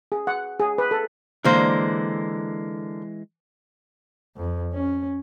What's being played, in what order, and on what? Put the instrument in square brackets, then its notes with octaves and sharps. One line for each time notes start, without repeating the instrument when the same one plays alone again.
[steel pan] G#4
F#5
G#4
B4
A4
[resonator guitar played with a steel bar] D3 A#3 C5 [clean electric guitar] E3 G#3
[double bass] F2
C#4